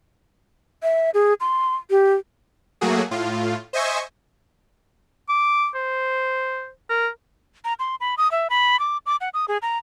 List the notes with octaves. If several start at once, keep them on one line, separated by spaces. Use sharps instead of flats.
E5
G#4
C6
G4
F#3 A3 A#3 F#4 G#4
A2 F4
C5 D#5 E5 G#5 C#6
D6
C5
A#4
A#5
C6
B5
D#6
E5
B5
D6
D6
F#5
D#6
G#4
A#5